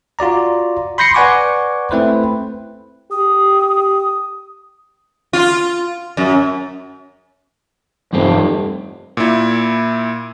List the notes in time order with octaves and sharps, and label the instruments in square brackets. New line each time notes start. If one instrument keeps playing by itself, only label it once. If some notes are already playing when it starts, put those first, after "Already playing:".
[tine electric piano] F4 F#4 D5 A#5
B5 C6 G6 A#6 C7 C#7
B4 D5 F#5 G#5 C#6 D6
A3 C4 E4 B4 C5
[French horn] G4 [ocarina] D#6
[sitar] F4
F#2
[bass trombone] F1 [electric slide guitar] E2 G2 C4
[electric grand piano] A#2 E4